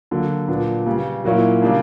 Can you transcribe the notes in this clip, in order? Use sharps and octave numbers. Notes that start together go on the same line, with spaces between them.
D3 F#3 A#3
A#2 F#3 B3 D4
C#3 G3 B3
A#2 F#3 A#3 C#4 E4
C#3 G3 A#3 D4